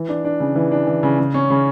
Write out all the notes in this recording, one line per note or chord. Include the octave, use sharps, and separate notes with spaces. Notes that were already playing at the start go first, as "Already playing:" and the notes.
Already playing: E3
D4
D4
C#3
E3
D4
E3
C#3
C#3
C#4
C#3